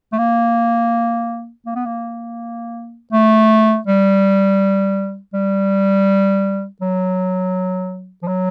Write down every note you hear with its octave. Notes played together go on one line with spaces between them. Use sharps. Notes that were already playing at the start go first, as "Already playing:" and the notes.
A3
A#3
A#3
B3
A#3
A3
G3
G3
F#3
F3
F#3